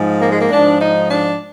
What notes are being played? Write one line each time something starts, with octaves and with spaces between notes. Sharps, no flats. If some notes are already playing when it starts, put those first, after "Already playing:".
Already playing: G#2 F3
A#3
G#3
A#3
G#2 F3 D4
D#4
D4